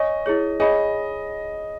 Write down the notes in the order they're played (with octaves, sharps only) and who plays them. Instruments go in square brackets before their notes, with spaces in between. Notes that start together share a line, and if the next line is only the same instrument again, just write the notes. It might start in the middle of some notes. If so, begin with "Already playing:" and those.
Already playing: [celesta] C#5 G#5 C#6 [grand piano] D#5
[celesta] E4 G#4 C#5
[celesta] G#4 C#5 G#5 B5 [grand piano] D#5